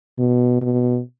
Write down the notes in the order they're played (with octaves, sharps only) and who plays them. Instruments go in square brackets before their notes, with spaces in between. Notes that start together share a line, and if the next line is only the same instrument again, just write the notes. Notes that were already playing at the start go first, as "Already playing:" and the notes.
[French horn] B2
B2